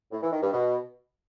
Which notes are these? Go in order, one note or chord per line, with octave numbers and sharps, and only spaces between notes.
A2
E3
D#3
G2
B2